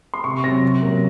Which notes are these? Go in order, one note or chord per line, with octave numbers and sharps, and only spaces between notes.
C6
C3 C#6
F#3 C4 A#6
C3
F#3 A#3